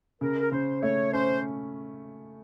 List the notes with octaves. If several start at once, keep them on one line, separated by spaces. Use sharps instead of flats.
C#3 A#4
A#4
C#3 C5
A3 C#5
C#4 C5